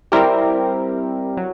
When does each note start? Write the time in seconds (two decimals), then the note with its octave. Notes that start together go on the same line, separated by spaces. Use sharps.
0.12 G3 C4 E4 G4 A#4
1.37 F#3